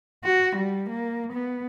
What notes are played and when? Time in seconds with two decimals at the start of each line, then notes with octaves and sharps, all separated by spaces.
0.24 F#4
0.56 G3
0.90 A#3
1.33 B3